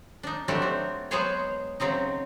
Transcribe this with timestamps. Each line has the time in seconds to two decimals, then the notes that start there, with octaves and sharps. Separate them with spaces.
0.23 D4 D#4
0.48 F#3 G3 A3 C4 D4 F#4
0.62 C4
1.11 F#3 G#3 B3 G#4 C5 C#5
1.80 C#3 F#3 C4 D#4